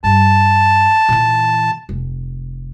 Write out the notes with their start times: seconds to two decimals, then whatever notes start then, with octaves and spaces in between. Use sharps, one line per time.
0.04 G2 G3 A5
1.09 A#2 E3
1.89 F1